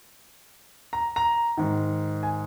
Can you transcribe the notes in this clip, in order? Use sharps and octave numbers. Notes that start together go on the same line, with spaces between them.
A#5
A#5
G#2 D#3
G#5